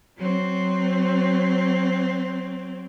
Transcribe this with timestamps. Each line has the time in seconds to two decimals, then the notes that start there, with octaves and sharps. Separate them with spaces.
0.18 F#3 C4